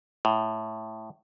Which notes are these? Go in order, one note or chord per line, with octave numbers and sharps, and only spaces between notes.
A2